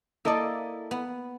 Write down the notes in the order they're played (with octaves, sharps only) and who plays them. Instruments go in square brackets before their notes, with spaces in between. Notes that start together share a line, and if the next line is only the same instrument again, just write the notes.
[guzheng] A#3 D5 [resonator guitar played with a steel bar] E4 A4 D#5
[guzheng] B3